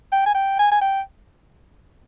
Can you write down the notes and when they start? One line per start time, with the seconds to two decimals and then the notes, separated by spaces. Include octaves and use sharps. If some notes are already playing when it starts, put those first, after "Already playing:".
0.12 G5
0.26 G#5
0.34 G5
0.59 G#5
0.71 G#5
0.81 G5